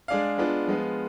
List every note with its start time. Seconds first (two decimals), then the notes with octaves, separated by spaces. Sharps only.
0.08 G#3 D4 G#4 D5 F5
0.38 G#3 B3 D4 F4
0.67 F3 G#3 B3 F4